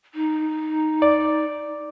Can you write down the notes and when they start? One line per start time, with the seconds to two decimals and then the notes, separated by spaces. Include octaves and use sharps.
0.14 D#4
1.02 D5